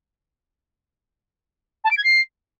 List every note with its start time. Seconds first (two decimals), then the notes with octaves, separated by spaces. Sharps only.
1.84 A5
1.90 D7
1.97 G#6
2.04 C7